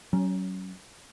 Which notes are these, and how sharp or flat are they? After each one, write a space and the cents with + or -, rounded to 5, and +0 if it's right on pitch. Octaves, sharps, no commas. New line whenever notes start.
F#3 +25 C#4 +0